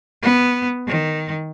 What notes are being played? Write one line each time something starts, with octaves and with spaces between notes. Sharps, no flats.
B3
D#3